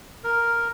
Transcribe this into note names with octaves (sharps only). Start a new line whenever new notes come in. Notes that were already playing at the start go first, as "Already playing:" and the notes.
A#4